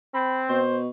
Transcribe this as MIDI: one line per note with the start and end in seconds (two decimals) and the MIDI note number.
0.14 0.60 60
0.14 0.40 83
0.49 0.88 47
0.49 0.78 72